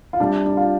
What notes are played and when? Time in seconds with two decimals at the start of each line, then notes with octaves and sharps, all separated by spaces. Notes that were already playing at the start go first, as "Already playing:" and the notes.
0.13 F4
0.20 C3 G3 D4
0.46 D4
0.57 F4